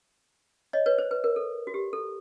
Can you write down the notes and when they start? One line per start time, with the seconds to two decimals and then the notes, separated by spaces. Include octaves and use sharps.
0.73 C#5 D#5
0.86 B4 C#5
0.98 C5
1.11 B4
1.24 A#4
1.36 A4
1.67 F#4
1.74 G4
1.93 A4